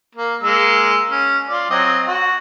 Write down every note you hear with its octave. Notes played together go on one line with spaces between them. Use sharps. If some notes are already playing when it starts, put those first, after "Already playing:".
A#3
G#3 A#3 E6
C#4
F4 D5
F#3 C4 D#5
F#4